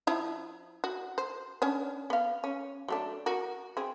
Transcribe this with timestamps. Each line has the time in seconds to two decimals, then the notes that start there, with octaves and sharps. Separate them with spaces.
0.07 F3 E4 E5
0.84 F#4
1.18 C5
1.62 C#4 D4 C#5
2.10 B3 F5
2.44 C#4
2.88 F#3 A3 D4
3.26 F#4 A#4
3.77 C4 G#4